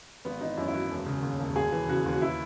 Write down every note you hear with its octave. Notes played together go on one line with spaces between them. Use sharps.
G#1 B3
E3 D#4
F#2 E4
E4
G#1 F#4
E1
C#3
D#2
E1
D#2 G#4
E3
C#3 F#4
D#2
F#4
E4